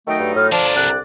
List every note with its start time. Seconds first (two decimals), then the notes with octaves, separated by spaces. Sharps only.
0.08 D#3 F#3 A3 D#4 G5
0.20 G2
0.36 A2 F6
0.52 D3 F3 D4 A#4 D5 A5
0.76 C2 F#6